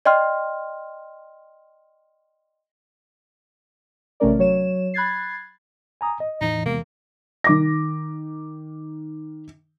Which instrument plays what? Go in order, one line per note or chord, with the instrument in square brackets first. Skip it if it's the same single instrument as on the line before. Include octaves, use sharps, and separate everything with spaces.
[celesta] D5 D#5 G5 C6 F6
[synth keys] A1 C3 A3 C#4 A#4 D5
F#3 C#5 E7
B5 F#6 G#6 A6 C7
[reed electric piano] G#5 A#5 D#6
D#5
[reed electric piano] E2 E3 [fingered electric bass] A2 [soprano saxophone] D#4
[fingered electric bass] C3 G#3 B3 [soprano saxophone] A#3
[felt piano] D#3 D6 A#6